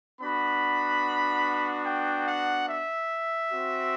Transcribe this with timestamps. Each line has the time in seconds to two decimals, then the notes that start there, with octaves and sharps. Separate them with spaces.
0.20 B3 D4 F#4 B5
1.86 G5
2.26 F#5
2.69 E5
3.51 C4 F#4